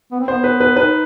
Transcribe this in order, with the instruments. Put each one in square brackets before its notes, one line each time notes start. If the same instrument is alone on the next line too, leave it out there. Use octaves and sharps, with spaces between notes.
[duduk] B3
C4
[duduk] B3 [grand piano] C5
[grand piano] B4
B4
[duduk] D#4 [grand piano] B4